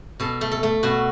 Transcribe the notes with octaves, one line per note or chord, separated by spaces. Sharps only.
B2 A4
A3
A4
A3
B2 F#4